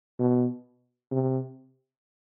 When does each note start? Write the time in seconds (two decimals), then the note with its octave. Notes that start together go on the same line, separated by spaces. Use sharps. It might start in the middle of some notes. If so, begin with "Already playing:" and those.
0.19 B2
1.11 C3